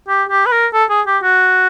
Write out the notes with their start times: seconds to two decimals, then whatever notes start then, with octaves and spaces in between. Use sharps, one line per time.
0.08 G4
0.29 G4
0.46 B4
0.52 A#4
0.73 A4
0.90 G#4
1.07 G4
1.23 F#4